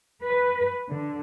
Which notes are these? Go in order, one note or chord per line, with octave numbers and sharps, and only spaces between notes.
B4
D3